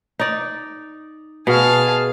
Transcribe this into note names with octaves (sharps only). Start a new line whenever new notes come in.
D#4 D5
B2 G#4 F5 A5